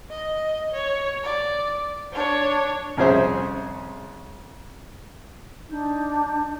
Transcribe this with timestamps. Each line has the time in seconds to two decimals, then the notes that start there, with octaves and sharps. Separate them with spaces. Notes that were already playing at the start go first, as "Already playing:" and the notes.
0.11 D#5
0.72 C#5
1.24 D5
2.12 D4 C#5
2.97 C2 F2 C#4 G#4 C5 E5
5.69 D4 D#4 G6